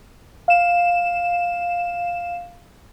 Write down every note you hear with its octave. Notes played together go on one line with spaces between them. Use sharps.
F5 E7